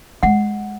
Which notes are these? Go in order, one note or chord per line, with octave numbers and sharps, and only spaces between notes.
G#3 F#5